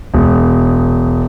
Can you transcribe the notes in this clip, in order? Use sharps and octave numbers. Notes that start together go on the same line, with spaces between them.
E1